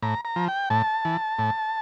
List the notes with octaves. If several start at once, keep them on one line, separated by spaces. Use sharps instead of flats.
A2 A#5
A#5
F3
G5
A2 A5
E3
A2